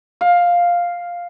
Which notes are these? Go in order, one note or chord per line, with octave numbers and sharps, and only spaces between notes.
F5